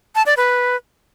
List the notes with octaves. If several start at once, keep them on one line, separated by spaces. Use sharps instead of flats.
A5
D5
B4